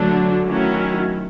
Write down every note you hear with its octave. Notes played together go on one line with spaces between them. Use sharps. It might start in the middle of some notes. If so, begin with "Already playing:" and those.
Already playing: D3 F#3 A3 D4
D#3 F#3 A3 C#4 E4